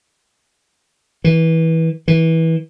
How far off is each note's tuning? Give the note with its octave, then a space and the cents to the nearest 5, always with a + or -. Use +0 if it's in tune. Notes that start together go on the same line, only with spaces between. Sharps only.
E3 -20
E3 -20